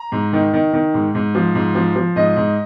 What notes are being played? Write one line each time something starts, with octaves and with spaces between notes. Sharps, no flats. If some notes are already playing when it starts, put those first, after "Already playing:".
Already playing: A#5
G#2
D#3
D#3
D#3
G#2
G#2
F3
G#2
F3
F3
G#2 D#5
G#2